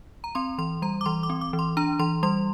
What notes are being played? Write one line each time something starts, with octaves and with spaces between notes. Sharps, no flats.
A#5
C4 C6
E3 C6
G3 A#5
D6
E3 C6
D6
C4
D6
E3
C6
D4 A#5
E3 C6
G3 C6